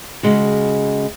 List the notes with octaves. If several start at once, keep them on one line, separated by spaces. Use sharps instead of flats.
C#3 G#3 F#4